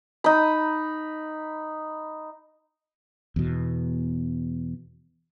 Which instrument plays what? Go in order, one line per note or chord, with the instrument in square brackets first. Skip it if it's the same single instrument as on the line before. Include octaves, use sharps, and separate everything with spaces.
[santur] D#4 B5
[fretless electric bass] E2 B2